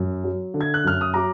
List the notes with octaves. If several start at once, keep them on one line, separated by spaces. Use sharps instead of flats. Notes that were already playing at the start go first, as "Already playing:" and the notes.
Already playing: F#2
F#3
D3
G#6
F#6
F#2 F6
D#6
F#3 A#5 D6